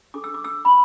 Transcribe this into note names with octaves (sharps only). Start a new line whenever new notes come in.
D4 A4 D6
E6
D6
E6
B5